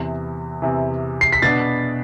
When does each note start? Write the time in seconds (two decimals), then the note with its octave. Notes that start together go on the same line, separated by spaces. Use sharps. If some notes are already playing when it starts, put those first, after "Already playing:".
Already playing: E2 C3 E3
0.62 E2 C3 E3
1.21 C7
1.33 B6
1.42 B2 B3 D4 A6